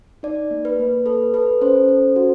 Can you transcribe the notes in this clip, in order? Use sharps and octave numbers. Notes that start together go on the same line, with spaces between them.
D#4 D5
A#3
B4
A#3
A4 B4
A4 B4
C#4 C5
A4
F#4